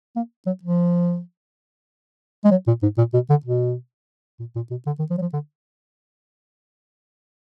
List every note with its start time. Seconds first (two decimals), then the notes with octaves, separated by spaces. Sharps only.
0.16 A#3
0.46 F#3
0.63 F3
2.44 G#3
2.51 F#3
2.67 A#2
2.82 G#2
2.98 A#2
3.13 B2
3.30 D3
3.45 B2
4.39 A#2
4.55 A#2
4.71 B2
4.86 D3
4.99 D#3
5.10 F3
5.18 F#3
5.21 F3
5.33 D3